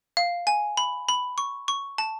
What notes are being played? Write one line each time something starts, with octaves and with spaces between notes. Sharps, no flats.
F5
G#5
B5
B5
C#6
C#6
A5